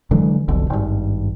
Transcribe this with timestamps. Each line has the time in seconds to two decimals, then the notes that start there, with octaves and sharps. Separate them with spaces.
0.11 D3 E3 F#3 G#3
0.48 F1 B1 D3
0.70 G#1 G2